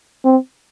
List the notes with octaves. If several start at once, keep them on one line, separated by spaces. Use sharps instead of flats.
C4